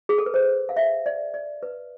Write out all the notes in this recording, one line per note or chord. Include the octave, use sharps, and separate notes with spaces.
G#4
A4
B4
C5
F5
E5
D5
D5
B4